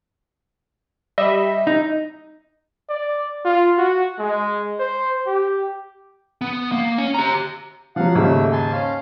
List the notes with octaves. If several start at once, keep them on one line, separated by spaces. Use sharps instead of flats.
G3 D#5 E5
D#4
D5
F4
F#4
G#3
C5
G4
B3
A#3
C#4
G4 A#5
F3 F#3 F5 F#5
D#2 G#2 C#3 A3 E6
G#5 A5 C6
C#4 F5